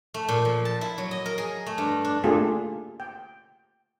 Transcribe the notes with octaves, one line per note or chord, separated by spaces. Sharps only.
A3
A#2
F3
A5
E4
F#3
D#5
A#4
G#4
A3
G2
D4
A3 A#3 D4 F4 G4 G#4
G5